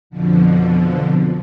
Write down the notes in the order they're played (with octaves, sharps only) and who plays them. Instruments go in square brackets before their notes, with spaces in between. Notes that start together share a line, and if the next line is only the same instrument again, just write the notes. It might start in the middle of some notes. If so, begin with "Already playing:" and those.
[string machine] F2 B2 D3 F3